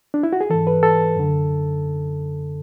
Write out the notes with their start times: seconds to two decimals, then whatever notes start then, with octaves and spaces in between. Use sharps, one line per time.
0.14 D4
0.23 E4
0.33 F#4
0.41 G#4
0.50 G#2 E3 A4
0.67 B4
0.83 A4
1.17 F#2 D3